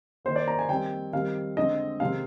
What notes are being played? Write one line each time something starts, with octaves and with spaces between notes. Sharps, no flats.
D#3 A#3 C5
D5
A#5
G#5
D#3 G3 C4 G5
D#3 G3 C4 F5
D3 G#3 C4 D#5
C3 D#3 G#3 C4 F5